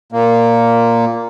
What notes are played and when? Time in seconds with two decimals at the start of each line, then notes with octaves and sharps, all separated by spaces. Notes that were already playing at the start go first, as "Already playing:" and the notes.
0.12 A#2 A#3